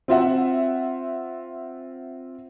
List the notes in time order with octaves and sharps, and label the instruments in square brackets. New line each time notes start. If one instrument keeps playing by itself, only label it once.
[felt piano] C4 F4 E5 F#5